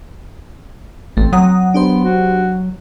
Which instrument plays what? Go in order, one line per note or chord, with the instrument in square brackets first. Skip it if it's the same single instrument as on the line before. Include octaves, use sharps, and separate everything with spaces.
[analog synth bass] A1 [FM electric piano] A3 [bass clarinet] C4
[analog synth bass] F#3 [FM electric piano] F#5 A#5 D#6
[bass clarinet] B3 [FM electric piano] D4 G4 C5
[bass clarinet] F#4